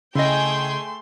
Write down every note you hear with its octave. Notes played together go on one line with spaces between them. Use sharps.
C#3 A3 E4 G#4 D#5 G5 C6